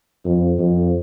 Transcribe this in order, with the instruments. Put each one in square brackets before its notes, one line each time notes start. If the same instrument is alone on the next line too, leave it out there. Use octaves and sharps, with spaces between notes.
[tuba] F2
F2